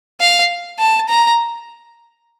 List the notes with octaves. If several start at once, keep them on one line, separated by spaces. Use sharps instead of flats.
F5
A5
A#5